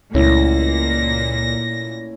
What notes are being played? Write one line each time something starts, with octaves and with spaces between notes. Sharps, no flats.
C#2 A#2 A3 C#4 E4 A#6